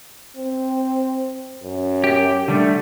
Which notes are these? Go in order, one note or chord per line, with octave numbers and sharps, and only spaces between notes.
C4
F#2
G4
D3 G3 A3